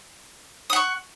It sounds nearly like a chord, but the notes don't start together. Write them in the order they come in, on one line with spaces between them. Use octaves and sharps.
D#6 F#5 C#6